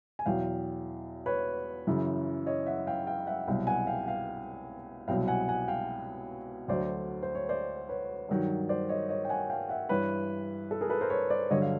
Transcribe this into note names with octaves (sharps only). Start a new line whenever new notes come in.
G#5
E2 B2 F#3 F5 G5
B4 C#5
F#2 C#3 E3
C#5 D#5
E5 F#5
F5 G5
F5 G5
E5 F#5
C2 B2 F#3 F5 G5
F#5 G#5
F5 G5
F5 G5
C2 B2 F#3 F5 G5
F#5 G#5
F#5 G#5
F5 G5
D2 D3 F#3 C5 D5
C5
C#5
C5 D5
B4 C#5
G2 D#3 F#3
C5 D5
C#5 D#5
C#5 D#5
G5
F#5 G#5
F5 G5
E5 F#5
G2 E3 B4 C#5
A4
G#4 A#4
A4 B4
A#4 C5
B4 C#5
C5 D5
G2 D3 F#3 C#5 D#5
F5